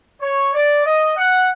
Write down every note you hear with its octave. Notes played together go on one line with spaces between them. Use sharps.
C#5
D5
D#5
F#5